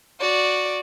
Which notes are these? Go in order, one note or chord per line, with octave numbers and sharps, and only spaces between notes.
F#4 D5